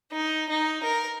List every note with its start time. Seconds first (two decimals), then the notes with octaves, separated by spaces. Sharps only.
0.12 D#4
0.49 D#4
0.83 A#4